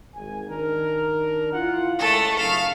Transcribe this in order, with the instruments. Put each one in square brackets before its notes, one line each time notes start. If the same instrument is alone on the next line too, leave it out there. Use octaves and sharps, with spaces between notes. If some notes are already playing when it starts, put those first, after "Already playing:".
[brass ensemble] G#1 G#5
D#3 D4 A#4
E4 F4 F#5
[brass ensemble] C#2 [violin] A3 A4
[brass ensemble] F#2 C#3 D#4 [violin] F5